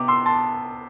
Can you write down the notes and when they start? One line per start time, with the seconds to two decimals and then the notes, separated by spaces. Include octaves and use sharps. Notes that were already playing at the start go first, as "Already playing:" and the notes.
Already playing: C3 B3 D6
0.08 C6 E6
0.26 A5 C6